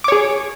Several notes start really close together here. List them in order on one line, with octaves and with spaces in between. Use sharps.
D6 C#5 G#4